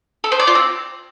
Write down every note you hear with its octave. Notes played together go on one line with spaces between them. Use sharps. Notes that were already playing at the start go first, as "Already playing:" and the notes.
A4
C5
D5
F4
C4